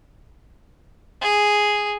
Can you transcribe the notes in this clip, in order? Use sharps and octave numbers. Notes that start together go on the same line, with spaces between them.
G#4